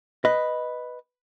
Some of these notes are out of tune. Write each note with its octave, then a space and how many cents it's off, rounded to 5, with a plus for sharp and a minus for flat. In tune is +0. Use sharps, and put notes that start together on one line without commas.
B4 +0 D#5 +0